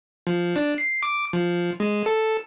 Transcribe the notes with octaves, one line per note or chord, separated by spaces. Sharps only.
F3
D4
C7
D6
F3
G#3
A4